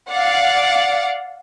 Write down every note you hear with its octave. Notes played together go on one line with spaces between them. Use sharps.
D5 F5 F#5